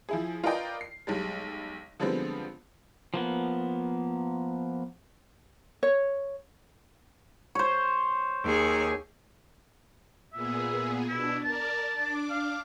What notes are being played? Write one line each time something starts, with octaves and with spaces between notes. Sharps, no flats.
F3 E4 G#4
F4 A#4 B4 D5 D#5 G5
C7
B1 G3 G#3
D3 F3 G3 G#3 B3 C4
F3 A#3 B3
C#5
C5 C#5
D#2 G#4
A#2 B3 G#4 E5
B2 D4 E4
A#4 D5 A5
D4 D6
F5